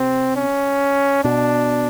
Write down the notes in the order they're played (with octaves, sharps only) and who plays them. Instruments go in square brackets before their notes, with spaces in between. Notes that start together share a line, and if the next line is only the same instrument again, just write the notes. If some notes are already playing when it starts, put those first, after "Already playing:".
Already playing: [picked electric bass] C3 [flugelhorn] C4
[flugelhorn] C#4
[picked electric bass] B2 [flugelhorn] D4